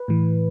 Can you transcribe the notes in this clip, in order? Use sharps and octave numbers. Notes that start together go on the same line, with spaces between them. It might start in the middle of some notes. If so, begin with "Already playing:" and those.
Already playing: B4
A2 E3